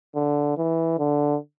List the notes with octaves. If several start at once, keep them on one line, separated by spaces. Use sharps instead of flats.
D3
E3
D3